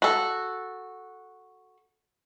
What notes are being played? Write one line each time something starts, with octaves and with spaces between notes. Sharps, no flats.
F#4 A4